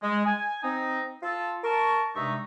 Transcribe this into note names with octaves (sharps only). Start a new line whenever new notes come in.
G#3
G#5
C4 D#4
F4 A4
A#4 A5 C#6
G2 C3 G#3 D#4 E5 C#6